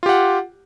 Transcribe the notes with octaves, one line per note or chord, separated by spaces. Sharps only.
F4 G4 F#5